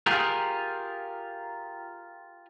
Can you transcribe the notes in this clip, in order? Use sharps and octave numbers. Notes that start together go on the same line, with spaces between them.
F4 G4 G#4 A#4